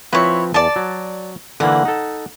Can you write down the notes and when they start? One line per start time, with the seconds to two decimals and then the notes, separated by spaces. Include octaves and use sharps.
0.13 F3 C4 E4 B4 C#5
0.54 E2 D5 A5
0.76 F#3
1.60 D3 E3 A#3 F#5
1.85 D#4 A4